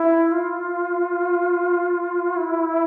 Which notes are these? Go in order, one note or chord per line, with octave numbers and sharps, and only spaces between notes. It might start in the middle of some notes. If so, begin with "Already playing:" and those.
Already playing: E4
F4
E4